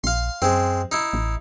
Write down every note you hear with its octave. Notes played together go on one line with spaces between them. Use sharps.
A#1 F5 C6
F#2 G#3 C4
D#4 E4
A1